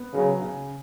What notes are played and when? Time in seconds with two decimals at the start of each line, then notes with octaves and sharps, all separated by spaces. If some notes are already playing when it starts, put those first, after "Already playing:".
Already playing: B3
0.14 C#3 F#3
0.42 C#3